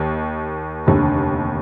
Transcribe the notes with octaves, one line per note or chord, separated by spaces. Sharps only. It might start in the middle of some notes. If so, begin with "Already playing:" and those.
Already playing: D#2 D#3 A#3
F1 D#2 D3